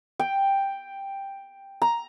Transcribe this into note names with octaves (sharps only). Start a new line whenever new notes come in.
G5
A#5